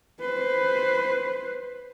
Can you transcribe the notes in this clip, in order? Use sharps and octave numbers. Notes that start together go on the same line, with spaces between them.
B4 C5